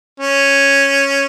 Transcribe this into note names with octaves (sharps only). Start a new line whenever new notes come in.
C#4